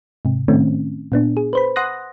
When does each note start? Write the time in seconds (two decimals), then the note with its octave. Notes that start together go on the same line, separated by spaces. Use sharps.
0.25 G#2 C3
0.48 A2 D#3 A3 C4 C#4
1.12 A#2 B3 D4
1.37 G#4
1.53 B4 C5 B5
1.76 F#5 C6 D#6 F#6 A#6